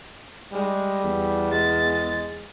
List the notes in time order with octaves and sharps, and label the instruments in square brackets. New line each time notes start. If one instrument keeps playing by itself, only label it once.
[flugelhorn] G3 [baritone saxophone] G#3
[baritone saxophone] E2
[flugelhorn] G#3 [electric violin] A6